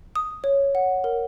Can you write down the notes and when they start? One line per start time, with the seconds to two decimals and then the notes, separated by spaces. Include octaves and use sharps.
0.16 D#6
0.44 C#5
0.75 F#5
1.04 A#4